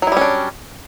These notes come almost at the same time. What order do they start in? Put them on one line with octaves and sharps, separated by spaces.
F#3 E4 G3 C#4 D4